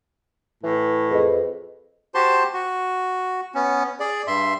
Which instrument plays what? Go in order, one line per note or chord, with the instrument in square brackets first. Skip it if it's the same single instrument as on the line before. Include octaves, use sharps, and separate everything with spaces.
[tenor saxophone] A2 [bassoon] E3
[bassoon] F2 [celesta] G#4 B4 D#5
[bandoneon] F#4 G4 C5 A5 C6
F#4
B3 C#4
G#4 D5
G2 E5 C6